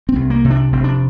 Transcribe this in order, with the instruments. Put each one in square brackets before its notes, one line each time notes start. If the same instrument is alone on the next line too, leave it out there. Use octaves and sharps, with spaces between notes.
[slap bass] C4
C2
A#3
C3
D4
F1 C4
D4